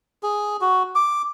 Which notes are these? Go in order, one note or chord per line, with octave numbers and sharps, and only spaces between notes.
G#4
F#4
D6